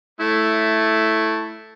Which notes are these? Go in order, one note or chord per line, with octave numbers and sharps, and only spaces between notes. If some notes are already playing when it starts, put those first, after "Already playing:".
A3 E4